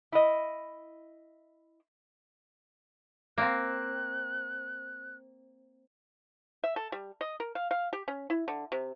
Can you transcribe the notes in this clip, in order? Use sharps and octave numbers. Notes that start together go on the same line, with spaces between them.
E4 D#5
A#3 C4 F#6
E5
A4
G3
D#5
A#4
F5
F5
G4
C#4
E4
D3
C3